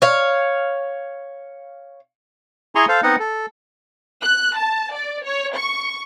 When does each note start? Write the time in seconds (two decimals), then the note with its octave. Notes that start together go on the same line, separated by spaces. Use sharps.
0.02 C#5 F5
2.75 E4 G#4 G#5 A#5 C6 C#6
2.88 A4 C5 F5
3.03 B3 C4 D#4 D#5 F#5
3.19 A4
4.23 F#6
4.57 A5
4.94 D5
5.24 C#5
5.56 C#6